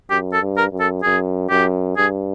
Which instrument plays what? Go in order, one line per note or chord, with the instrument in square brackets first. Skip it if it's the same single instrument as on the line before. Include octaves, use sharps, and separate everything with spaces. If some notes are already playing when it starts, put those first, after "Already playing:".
[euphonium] F#2 [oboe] G4
[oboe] A4
[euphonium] G2
[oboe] A#4
[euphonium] F#2
[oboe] A4
[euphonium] F#2 [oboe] G#4
[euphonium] F#2 [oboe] G4
[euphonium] G2 [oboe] G#4